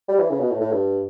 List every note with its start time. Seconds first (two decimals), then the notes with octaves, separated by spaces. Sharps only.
0.08 G3
0.19 E3
0.30 C#3
0.40 B2
0.51 A2
0.61 A2
0.71 G2